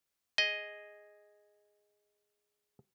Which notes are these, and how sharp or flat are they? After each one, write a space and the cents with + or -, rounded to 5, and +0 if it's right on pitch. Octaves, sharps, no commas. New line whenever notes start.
G#4 +0 D#5 +0